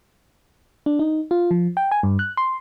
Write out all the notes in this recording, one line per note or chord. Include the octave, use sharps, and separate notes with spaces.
D4
D#4
F4
F3
G5
G#5
G2
F#6
C6